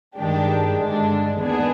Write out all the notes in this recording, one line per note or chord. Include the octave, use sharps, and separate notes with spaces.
G2 D#3 G#3 D4 G4
G2 D3 G#3 D4
D#2 D#3 B3 D4 G#4